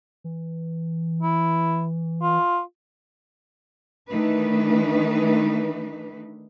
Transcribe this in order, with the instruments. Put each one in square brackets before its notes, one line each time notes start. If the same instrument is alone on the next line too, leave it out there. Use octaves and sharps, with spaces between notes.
[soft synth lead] E3
[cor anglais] E4
F4
[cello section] D#3 E3 A3 D4 D#4 B4